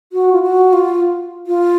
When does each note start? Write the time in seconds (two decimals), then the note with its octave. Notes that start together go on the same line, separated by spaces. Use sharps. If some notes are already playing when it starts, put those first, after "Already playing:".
0.13 F#4
0.33 F4
0.42 F#4
0.73 F4
1.47 F4